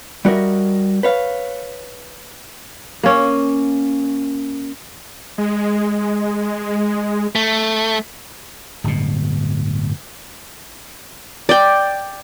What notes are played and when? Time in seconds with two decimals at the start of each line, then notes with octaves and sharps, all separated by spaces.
0.25 G3 F#4 A#4 D#5 E5
1.03 B4 C#5 F5
3.03 A#3 C#4
5.38 G#3
7.35 A3
8.84 D1 G1 B2
11.49 D5 G5